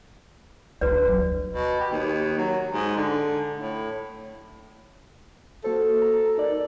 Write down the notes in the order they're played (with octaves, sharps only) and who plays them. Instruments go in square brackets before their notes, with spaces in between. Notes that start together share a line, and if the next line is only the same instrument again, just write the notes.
[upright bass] D2 D3 [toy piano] F#4 B4 D5
[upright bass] F#3
[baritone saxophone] B2
G4
D#2
F#3
G#2
D3
A2
[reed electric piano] A#3 F#4 C5 [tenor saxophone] A4
[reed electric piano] A#5
D#4 A#4 D5